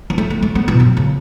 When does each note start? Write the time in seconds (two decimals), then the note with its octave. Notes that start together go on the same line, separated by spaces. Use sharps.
0.10 B3
0.18 A3
0.30 B3
0.43 A3
0.55 B3
0.68 B2
0.80 F#2
0.97 C#3